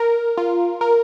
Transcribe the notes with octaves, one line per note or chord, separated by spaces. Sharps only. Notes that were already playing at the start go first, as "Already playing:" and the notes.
Already playing: A#4
F4
A#4